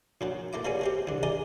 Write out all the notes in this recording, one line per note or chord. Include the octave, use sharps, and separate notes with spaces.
A#1 F#2 F#3
A3 A#3 E4 D6
G3 G#3 A#3 B3 C#4 G#4
G#3 C4 G4
C2 D3
G#4 A#4 D5 D#5